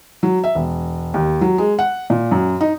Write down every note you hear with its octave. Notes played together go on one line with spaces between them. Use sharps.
F#3
E5
E1
D#2
F#3
G#3
F#5
A#2
F#2
D#4